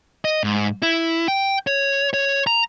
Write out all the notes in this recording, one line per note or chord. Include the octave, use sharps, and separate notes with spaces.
D#5
G#2
E4
G5
C#5
C#5
A#5